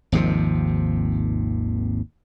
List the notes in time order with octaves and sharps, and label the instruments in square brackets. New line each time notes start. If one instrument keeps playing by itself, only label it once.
[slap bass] G#1 D#2 C3 F3